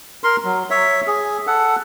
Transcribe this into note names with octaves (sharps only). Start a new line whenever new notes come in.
A#4 C6
F#3
C#5 E5
G#4
A4 F#5